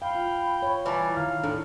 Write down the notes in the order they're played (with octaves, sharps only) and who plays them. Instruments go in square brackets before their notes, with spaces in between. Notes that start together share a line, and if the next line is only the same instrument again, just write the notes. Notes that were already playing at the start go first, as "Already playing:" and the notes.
[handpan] F5 [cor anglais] G5 [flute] B5
[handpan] F4
C#5
[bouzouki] E3 A5 [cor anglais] G3 [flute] A#5
[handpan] D#3 [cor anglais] F5
[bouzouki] A2 [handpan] D4